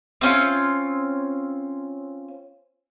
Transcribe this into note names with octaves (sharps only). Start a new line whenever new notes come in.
C4 C#4 F4